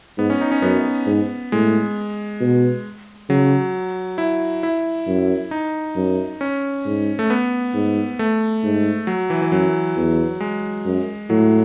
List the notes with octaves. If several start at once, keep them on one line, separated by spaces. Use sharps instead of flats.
G#2 B3
C#4
D#4
C#4
F#2 B3
G#2
A2 G#3
B2
C#3 F#3
E4
E4
F#2
D#4
F#2
C#4
G#2
A3
B3
G#2
A3
G#2
F#3
E3
E3
F#2 F#3
E2
G#3
F#2
A2 F#3